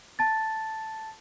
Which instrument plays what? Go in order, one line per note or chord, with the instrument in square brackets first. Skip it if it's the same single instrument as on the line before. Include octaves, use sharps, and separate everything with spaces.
[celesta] A5 A6